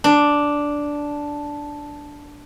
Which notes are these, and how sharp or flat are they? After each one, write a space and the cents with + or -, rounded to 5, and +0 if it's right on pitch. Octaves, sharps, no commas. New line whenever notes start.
D4 -5